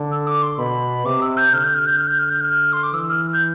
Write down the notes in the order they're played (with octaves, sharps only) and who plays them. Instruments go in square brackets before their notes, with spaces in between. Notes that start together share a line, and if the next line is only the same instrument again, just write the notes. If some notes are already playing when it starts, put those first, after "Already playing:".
Already playing: [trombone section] D3
[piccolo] E6
D6
C6
[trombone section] B2 [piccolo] B5
[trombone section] C3 [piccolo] D6
[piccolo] E6
G6
[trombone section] D3 [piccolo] F6
[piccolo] G6
F6
G6
F6
G6
F6
G6
F6
C6
D6
[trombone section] E3 [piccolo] E6
[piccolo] F6
G6